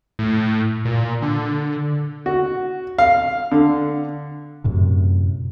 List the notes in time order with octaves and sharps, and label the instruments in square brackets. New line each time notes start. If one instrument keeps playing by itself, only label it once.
[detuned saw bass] A2
A#2
D3
[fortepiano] F#4
F5
D3
[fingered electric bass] F#2 A2 C3